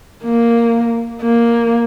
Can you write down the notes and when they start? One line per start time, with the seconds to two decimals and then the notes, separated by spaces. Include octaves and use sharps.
0.24 A#3
1.22 A#3